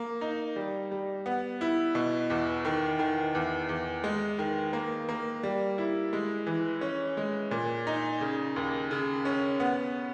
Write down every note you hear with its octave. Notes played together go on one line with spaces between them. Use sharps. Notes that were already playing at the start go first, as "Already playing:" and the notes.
Already playing: A#3
D#4
G3
G3
B3
E4
B2
E2
D#3
D#3
E2
E2
G#3
D#3
A#3
A#3
G3
E4
G#3
E3
C#4
G#3
A#2
D#4
C#3
D#2
C#3
C#4
B3